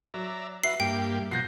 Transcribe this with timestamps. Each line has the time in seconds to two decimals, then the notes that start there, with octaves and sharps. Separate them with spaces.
0.14 F#3 D5 E5 A#5
0.63 F#4 B4 E5 C7
0.80 G2 A#3 G4 G5
1.31 B2 F3 F#4 G6 A#6 C7